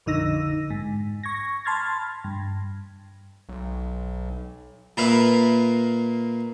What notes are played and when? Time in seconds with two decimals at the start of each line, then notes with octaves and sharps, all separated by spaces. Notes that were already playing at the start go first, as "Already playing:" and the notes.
0.06 A#1 F2 D3 D#4 E6 A#6
0.70 G#2
1.24 C#6 G#6 A#6
1.65 A5 B5 C6 F6 G#6 A6
2.24 G2
3.49 B1
4.97 A#2 A#3 B4 E5 F5